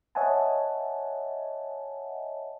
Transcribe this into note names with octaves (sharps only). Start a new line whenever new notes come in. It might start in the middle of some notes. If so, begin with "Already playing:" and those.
C#5 D#5 E5 F#5 G#5 A5